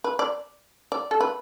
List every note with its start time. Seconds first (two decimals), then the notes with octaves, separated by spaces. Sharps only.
0.04 B4
0.19 D5
0.92 D5
1.11 A4
1.21 B4